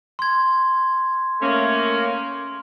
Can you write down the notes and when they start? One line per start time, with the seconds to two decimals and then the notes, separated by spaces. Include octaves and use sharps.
0.19 C6 G#6
1.41 A3 A#3 C#4